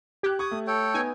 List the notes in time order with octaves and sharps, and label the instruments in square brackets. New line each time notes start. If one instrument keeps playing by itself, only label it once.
[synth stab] G4 [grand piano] F#6 G#6
[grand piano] C#6 G#6 [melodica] D#6
[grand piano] A3
[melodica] A4 C#5 G5
[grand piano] B3 D#4 [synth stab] G#5